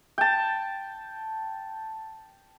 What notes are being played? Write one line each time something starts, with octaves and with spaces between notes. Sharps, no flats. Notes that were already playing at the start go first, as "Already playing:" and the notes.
G5 A5